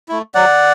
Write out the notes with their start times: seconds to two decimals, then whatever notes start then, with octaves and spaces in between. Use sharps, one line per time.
0.09 A3 E4
0.34 F#3 D5 F#5